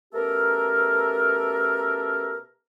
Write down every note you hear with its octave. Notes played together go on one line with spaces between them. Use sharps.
B2 A3 C#4 G4 A4 A#4